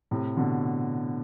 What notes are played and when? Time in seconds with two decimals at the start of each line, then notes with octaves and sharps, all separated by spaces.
0.11 A2 C3
0.37 B2 D3